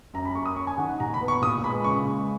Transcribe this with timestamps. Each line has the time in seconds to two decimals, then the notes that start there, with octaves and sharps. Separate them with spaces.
0.14 F#2 A#5
0.25 B5
0.35 A#3 C#6
0.46 D#6
0.56 C#4 C#6
0.67 G#5
0.78 D#3 F#5
0.89 F#5
1.00 A#2 A#5
1.14 B5
1.21 B3
1.28 C#6
1.42 A#2 D#6
1.64 G#3 B5
1.84 C#3 C#6
2.07 G#3